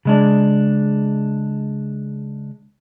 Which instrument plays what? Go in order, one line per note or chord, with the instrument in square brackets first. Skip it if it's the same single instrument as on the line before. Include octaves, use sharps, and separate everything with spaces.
[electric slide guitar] C#3 G#3 D4